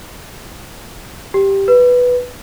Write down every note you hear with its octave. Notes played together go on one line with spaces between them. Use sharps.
G4
B4